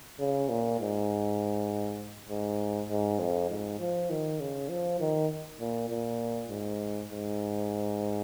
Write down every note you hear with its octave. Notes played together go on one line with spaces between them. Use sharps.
C#3
A#2
G#2
G#2
G#2
F2
G#2
F3
D#3
C#3
F3
D#3
A#2
A#2
G#2
G#2